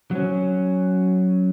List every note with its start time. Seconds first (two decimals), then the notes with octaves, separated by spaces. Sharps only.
0.11 F#3 C#4